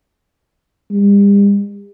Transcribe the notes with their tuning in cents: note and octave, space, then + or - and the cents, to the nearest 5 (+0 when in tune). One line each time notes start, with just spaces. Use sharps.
G3 +45